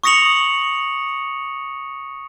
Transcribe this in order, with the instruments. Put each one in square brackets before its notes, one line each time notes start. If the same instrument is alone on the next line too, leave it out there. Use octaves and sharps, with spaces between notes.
[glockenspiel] C#6 D#6 A#6 C#7 F7 F#7